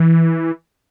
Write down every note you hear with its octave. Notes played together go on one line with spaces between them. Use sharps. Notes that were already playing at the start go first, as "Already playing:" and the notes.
Already playing: E3